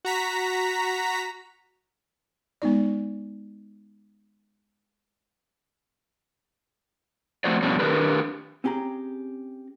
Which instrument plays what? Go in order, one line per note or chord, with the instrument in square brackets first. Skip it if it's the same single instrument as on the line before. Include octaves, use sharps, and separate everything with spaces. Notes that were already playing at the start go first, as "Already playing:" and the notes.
[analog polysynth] F#4 A#5 B6
[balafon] G#3 B3 D#4 D5
[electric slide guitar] F3 A3 C4 F#4 C5 D5
F2 B2 G3 C#4 D4
D#3 F3 D4 G4 A#4 B4
[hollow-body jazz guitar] C4 C#4 G4 G#4 A#5